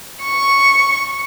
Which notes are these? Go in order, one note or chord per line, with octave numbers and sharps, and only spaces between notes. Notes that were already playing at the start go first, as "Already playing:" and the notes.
C#6